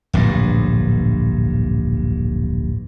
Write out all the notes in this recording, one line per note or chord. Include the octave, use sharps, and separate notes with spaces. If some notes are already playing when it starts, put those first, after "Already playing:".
D1 A#1 G2